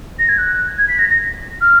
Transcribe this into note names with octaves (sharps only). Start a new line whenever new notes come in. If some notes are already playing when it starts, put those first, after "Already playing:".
A#6
G#6
F#6
G#6
B6
A#6
A#6
F6